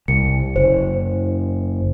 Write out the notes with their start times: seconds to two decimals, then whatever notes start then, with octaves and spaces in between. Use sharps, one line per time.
0.08 C2 C#7
0.56 F#1 C5